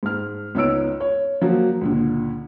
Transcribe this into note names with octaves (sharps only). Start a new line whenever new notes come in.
G#2 F6
C#2 B3 D#4 C#5 E6 D7
C#5
F3 F#3 A#3 F#4
C#2 A#2 D3